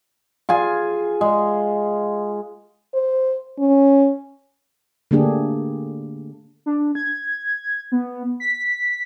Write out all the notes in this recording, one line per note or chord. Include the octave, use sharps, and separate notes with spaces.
F4 G#4 G#5
G#3
C5
C#4
D3 A3 A#3 D4 G4 G#4
D4
G#6
B3
B6